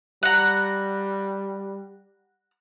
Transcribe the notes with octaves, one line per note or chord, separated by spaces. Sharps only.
G3 F#5 A#5